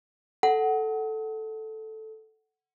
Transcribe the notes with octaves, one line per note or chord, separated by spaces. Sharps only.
A4 F#5